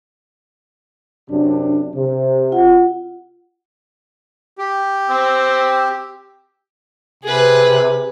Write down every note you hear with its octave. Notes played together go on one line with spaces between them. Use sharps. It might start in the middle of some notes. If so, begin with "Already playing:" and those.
F#2 C3 D4
C3
F4 F#5
G4
C4 E6
C3 G#4 B4